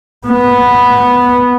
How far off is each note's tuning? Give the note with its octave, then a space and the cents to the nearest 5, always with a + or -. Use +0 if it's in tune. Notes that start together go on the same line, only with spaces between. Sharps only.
B3 -5